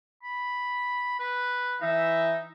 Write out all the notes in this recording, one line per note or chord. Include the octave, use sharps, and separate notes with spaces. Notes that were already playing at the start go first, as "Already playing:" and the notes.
B5
B4
E3 D#4 E5